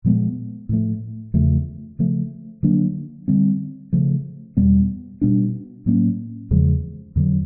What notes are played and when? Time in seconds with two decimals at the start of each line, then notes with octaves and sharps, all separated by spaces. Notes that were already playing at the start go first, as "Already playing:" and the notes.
0.05 A#2 F3 G#3 B3
0.69 A2 F3 A3
1.34 E2 C#3 F3 A3
1.99 C#3 F3 A3
2.63 D3 F#3 A#3 D4
3.28 D3 G3 C4
3.93 C#3 F3 A3
4.57 E2 B2 G3 B3
5.21 B2 G3 B3 D4
5.86 A2 F#3 A#3 C#4
6.51 E2 C#3 F3 G#3
7.16 F2 D3 F#3